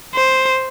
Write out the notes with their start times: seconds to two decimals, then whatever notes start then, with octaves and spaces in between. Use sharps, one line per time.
0.15 C5